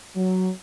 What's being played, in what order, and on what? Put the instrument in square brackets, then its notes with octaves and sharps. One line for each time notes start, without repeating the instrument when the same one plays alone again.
[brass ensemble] F#3